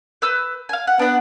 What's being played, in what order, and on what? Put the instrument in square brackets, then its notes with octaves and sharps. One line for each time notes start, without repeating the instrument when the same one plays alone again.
[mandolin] B4 E6 G6
F5 G#5
F#5
[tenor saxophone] B3 [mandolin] D4 F#5